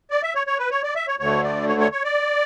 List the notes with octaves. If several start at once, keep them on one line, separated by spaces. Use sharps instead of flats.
D5
E5
C#5
C#5
B4
C#5
D5
E5
C#5
D2 D3 A3 C#5
D5
C#5
C#5
C#5
D5